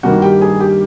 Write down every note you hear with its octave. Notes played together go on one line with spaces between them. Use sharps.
G2 D#3 G3 A#3 F#4 F#5
G4 G5
G#4 G#5
G4 G5